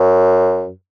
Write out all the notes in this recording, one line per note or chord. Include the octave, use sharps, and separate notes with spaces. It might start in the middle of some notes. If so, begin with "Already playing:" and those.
Already playing: F#2